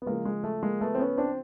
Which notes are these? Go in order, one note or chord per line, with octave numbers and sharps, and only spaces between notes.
B3
C#3 F3 G#3 A#3
G#3
A3
G#3 A#3
A3 B3
C4
B3 C#4
C4 D4